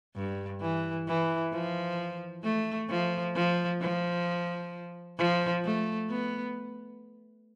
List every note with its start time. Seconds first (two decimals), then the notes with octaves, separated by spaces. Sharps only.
0.16 G2
0.61 E3
1.08 E3
1.53 F3
2.44 A3
2.89 F3
3.35 F3
3.81 F3
5.18 F3
5.64 A3
6.10 B3